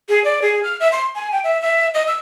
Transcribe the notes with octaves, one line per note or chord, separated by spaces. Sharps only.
G#4
D5
G#4
F6
E5
C6
G#5
G5
E5
E5
D#5
E6